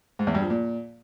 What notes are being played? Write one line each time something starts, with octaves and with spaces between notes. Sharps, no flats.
G#2
E2
G2
F3
A#2